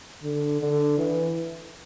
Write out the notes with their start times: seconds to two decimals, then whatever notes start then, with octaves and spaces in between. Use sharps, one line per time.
0.23 D3
0.61 D3
0.98 E3